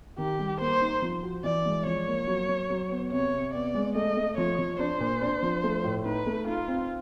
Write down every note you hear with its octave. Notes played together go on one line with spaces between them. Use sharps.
D#3 G4
G3
A#3 C5
D#4
F3
F#4
E3 D5
G#3
F3 C#5
A#3
F#3
F#3
F#3
B3
C3 C#5
C3
B3 D5
G#3
A3 D#5
A3
F3 C#5
F3
D4 C5
A#2
D4
F3
A3
A2
D#4 B4
A3
D#4 F4
C4